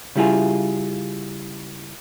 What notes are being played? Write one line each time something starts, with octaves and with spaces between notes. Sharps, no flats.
C#3 G3 E4 F4 G#4